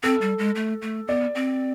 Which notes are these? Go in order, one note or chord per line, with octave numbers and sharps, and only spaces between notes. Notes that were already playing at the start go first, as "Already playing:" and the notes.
C4 A4
G3
G#3
A3
A3
B3 D5
C4